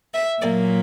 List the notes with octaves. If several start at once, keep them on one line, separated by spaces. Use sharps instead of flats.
E5
A#2 F#3 A#3 D5